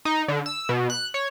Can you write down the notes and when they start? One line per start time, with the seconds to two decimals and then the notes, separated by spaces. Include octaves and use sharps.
0.05 D#4
0.28 D3
0.46 E6
0.69 B2
0.90 F#6
1.14 C#5